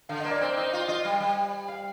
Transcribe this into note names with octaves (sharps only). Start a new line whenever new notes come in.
D3 F5
A#3 D#5
D5
C4 C5
D#4 D#5
F4 F5
F4 D#5
G3
G3
F5